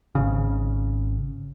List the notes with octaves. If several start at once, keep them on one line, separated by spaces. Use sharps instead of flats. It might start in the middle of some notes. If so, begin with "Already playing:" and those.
G#1 C#3